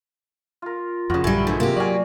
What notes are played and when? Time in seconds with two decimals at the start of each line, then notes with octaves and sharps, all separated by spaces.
0.62 F4 A#4
1.10 F2 A2 C#3 F4 F#4 F5
1.24 A#1 G2 D3 G3 E4 G#5
1.47 D3 E3 G#3 A3 C5
1.60 C3 A#3 G4
1.76 F#3 F#4 D5 F5 G#5